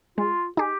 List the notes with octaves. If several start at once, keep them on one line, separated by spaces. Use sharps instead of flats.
G#3 F4
D#4 G4 G#4